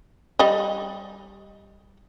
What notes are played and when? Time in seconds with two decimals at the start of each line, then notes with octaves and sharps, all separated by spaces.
0.39 G3 D#5